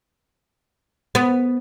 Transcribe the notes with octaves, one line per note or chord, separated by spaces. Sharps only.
B3